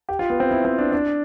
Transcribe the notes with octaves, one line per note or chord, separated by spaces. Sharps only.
G4
F4
B3
C4
E4
C4
D4
D4